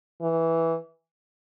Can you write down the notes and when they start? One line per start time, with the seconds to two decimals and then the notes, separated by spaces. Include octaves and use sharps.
0.22 E3